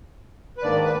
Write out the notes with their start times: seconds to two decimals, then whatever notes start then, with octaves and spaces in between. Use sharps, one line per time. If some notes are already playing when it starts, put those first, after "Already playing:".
0.58 B4
0.63 G#2 D#3 A#3 D4 D5
0.83 B4